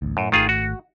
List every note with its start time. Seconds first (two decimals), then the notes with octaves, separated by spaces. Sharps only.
0.02 A1 D2
0.17 F#2 A2
0.32 G#1 D#3 A3 F4 G#4
0.49 F#4